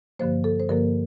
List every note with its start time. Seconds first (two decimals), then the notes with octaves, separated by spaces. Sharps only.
0.19 G2 D3 F3 A#3 C5
0.44 A4
0.60 C5
0.69 G2 D3 F3 A#3 A#4